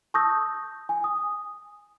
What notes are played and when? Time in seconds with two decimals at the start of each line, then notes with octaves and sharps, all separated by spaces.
0.14 A5 C#6 D#6 E6 G6 A#6
0.89 G#5
1.04 D#6